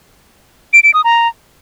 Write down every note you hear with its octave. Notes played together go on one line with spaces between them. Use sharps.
D7
D7
D#6
A#5